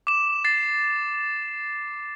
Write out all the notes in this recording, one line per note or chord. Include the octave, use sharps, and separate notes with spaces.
D6 E7
A6 C7